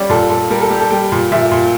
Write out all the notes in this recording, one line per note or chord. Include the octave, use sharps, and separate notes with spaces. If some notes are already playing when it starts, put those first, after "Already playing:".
Already playing: G3 C#4 D5
A#2 A4
A#2 A4
G3 A#4
A4
G3 G4
A4
G3 G5
A#2
A#2 E5
A#2